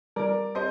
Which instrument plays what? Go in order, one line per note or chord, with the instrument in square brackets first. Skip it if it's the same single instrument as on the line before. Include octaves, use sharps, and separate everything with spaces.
[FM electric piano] G3 [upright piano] A#4 D5
[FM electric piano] C4 G4 [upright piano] C5 D#5